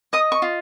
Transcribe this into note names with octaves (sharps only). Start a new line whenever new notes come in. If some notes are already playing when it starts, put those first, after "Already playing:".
D#5 D#6
C#6
F4